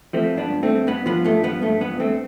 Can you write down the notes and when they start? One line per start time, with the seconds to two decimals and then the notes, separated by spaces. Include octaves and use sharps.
0.13 F3 A3 C4
0.32 G2
0.38 B3 D4
0.50 G2
0.63 A3 C4
0.69 G2
0.87 G2 B3
1.06 F3 B3
1.24 G2 A3
1.43 F3 B3
1.62 G2 A3
1.81 G2 B3
1.99 G2 A3 C4